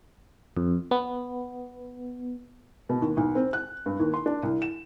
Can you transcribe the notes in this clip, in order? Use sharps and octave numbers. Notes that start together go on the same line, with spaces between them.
F2
B3
B2
D#2
B1
C4
F#6
G2
D#2
C6
D4
C2
E7